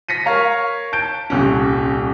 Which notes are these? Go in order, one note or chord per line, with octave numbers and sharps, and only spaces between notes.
A#6 B6 C#7 D#7
A#4 C#5 F5 A#5
A5 G6 D7
D#1 C2 C#4